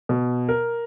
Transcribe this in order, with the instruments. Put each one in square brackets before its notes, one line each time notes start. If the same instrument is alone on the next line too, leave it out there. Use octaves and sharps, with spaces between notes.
[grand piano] B2
A#4